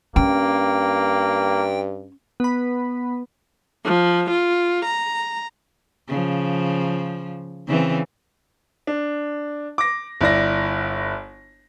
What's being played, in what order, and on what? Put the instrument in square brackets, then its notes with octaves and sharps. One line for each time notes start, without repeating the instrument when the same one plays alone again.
[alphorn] G2 [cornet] A#3 [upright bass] C#4 [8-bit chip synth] G5
[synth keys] B3 B5
[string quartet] F3
F4
A#5
[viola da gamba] C#3 F3
C#3 E3 C4
[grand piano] D4
D6 A#6
G1 E4 D5 A#6